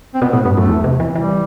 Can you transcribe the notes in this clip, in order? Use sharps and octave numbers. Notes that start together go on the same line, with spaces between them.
C4
B2 B3
A2 B3
G2 B3
F#2 A3
E2
C3
E3
E3 G3